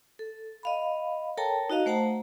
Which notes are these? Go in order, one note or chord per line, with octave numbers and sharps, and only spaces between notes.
A4
D#5 F5 B5
A4 A#4 C#5 G5 A5 A#5
D#4 F#4 D#5 F5
A3 C5 F#5 A5 A#5